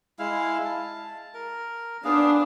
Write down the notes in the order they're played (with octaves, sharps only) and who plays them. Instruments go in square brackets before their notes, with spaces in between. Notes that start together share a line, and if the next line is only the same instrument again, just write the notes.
[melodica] G#3 E4 F5
A5
A#4
[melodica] B3 G#4 F5 [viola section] D4